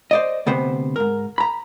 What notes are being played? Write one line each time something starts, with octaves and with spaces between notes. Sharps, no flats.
C5 D5 D#5
D2 C3 B3 C5
G#2 A#4
A#5 B5